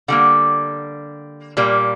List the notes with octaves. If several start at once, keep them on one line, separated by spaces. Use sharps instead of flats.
D3 G3 A#3 F#5
A#2 G3 A#3